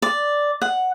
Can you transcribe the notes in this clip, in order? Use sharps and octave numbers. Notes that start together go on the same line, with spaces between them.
D5
F#5